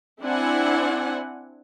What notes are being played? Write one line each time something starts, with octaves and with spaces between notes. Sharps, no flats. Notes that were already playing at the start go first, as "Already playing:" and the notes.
C4 D4 E4 F#5 G#5